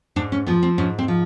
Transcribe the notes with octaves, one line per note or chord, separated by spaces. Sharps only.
G#2 D4
C#4
F3 B3
C4
G#2 C#4
C4
F3